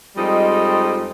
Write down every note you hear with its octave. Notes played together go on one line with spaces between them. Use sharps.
F2 G3 G#3 D#4 C5 D#5